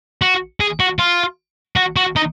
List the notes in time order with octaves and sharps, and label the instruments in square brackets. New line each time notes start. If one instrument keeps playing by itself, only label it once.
[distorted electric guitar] F#4
G#4
F#4
F4
F#4
F#4
D#4